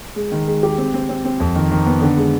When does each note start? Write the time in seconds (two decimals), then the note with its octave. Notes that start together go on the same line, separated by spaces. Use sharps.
0.16 G#3
0.32 D#3
0.47 G#3
0.63 G4
0.78 C4
0.94 C4
1.09 C4
1.25 C4
1.40 F2
1.56 D#3
1.72 D#3
1.87 B3
2.02 D3
2.17 G#3